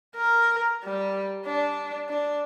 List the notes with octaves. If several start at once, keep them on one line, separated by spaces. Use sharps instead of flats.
A#4
G3
D4
D4